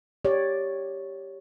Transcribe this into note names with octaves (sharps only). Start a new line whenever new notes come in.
G4 C#5 D5